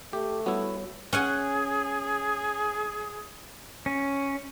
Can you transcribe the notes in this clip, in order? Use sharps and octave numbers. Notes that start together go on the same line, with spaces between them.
A3 G4
G3 B3 E4 F#4 C#5
C#4 G#4 F#5 G#5
C#4